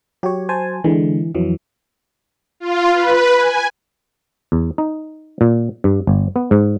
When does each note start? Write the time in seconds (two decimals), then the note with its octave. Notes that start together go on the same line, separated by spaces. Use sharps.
0.23 F#3 G4 C#5
0.49 C5 G#5 A5
0.84 D3 E3 G#3
1.35 F2 E3 F#3
2.60 F4
2.93 B4
3.37 G#5
4.52 E2
4.78 D#4
5.41 A#2
5.84 G2
6.07 G1
6.36 B3
6.51 G#2